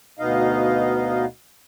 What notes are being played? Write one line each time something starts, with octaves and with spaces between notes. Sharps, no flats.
D2 B2 B3 D#4 D#5 F5